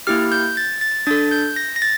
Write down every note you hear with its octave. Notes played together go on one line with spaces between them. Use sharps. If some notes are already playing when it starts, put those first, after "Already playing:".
A#3 E4 G4 F6
G6
A6
A6
D4 A4 A6
G6
A#6
A#6
A6